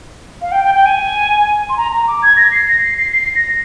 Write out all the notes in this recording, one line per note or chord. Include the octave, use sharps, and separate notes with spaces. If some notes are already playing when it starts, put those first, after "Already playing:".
F5
G5
G5
G5
G#5
C6
A#5
A#5
D6
G#6
A#6
C7
A#6
C7
C7
C7
A#6